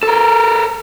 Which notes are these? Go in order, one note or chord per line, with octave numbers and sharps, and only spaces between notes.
A4 A#4